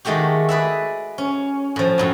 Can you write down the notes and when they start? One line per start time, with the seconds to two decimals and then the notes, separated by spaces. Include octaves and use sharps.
0.05 D#3 G#3 A3 F#4 G4
0.49 G#4 B4 D5 E5
1.18 C#4
1.76 A2 F3
1.98 F#2 A2 F#3